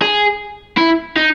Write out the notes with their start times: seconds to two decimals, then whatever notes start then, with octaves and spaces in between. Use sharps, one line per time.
0.02 G#4
0.77 E4
1.17 D#4